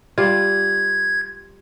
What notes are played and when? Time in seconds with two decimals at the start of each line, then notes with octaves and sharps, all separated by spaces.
0.18 G3 F4 G#6